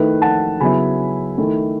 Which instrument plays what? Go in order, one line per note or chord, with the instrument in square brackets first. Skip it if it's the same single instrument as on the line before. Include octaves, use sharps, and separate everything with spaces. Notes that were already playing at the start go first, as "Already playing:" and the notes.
Already playing: [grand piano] D#3 A3 E4 B4
F#5 A5
C#3 F#3 B3 E4 G#5 B5
D#3 A3 E4